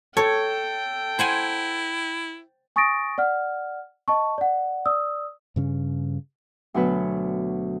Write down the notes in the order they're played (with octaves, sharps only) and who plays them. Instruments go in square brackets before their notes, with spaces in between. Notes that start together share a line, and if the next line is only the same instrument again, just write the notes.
[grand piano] A4 [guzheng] C#5 [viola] G5
[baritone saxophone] E4 [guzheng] C5 F#5 G#5
[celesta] G#5 C#6 D#6 A6 A#6 D7
D5 F#5 F6
D#5 A5 C#6
D5 F#5
D5 D#6 E6
[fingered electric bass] G2 C#3 C#4
[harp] D2 B2 F#3 B4